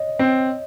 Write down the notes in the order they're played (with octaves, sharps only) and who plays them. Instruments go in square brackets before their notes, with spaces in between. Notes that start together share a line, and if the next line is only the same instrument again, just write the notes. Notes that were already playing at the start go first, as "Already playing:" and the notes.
Already playing: [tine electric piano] C#5 D#5
[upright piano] C4